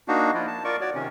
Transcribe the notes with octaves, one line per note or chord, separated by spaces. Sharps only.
A#3 D4 D#4 F#4
F3 A#3 E4 F4
A5
F4 A#4 D5 C#6
F#4 C#5 D5
C3 D#3 C#4